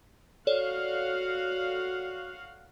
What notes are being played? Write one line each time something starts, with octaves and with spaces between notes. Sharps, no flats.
F#4 A4 C#5 D5 F5 F#5